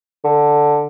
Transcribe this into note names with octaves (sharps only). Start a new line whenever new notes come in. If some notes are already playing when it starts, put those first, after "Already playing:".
D3